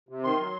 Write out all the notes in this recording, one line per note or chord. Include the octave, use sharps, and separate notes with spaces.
C3
D#3 C6
F#3